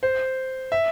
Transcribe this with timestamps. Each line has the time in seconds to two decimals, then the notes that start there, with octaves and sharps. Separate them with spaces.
0.03 C5
0.72 E5